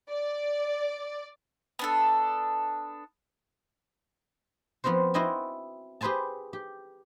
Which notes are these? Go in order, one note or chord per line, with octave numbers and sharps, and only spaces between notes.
D5
B3 D4 A4
F3 B3 C4 F#4 C5
E4 F#4 C5 D#5 G5 G#5
G4 G#4 B4 C5 G#5 A5
G4